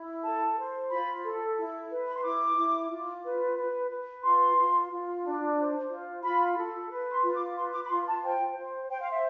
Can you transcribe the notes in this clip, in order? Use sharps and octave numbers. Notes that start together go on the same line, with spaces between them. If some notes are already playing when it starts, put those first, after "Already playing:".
Already playing: E4
A4 A5
C5
F4 B5
A4
E4
B4
B5
C6
E4 D6
E4
F4
B4
B4
B4
F4 C6
F4
F4
D4
C5
F4
F4 B5
A4
B4
C6
F4
D6
B4 C6
D6
B5
F4 C6
A5
C5 G5
C5
C5 G5
F5
E5